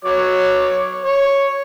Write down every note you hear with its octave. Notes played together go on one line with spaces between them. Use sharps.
F#3 C#5 D6
C#5